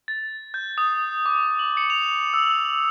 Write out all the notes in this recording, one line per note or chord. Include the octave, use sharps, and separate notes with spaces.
A6
G6
D#6
D6
F#7
C#7
F7
E6